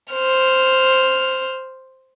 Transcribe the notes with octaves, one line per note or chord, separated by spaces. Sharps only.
C5 F6